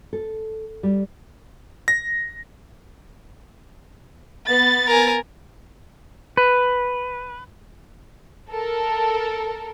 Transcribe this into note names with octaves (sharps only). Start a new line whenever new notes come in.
A4
G3
A#6
B3 A6
A#4 G#5
B4
A4 A#4